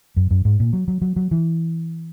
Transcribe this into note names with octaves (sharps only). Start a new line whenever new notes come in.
F#2
F#2
G#2
A#2
F#3
F#3
F#3
F#3
E3